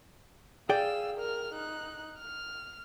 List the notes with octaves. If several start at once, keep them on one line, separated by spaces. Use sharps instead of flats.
G#4 D5 F5 G5 E6
A#4 F6
D#4 F#6
F6